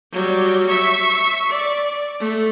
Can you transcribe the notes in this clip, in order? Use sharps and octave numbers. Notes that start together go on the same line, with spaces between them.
F#3 G3
E5 C#6
D5
A3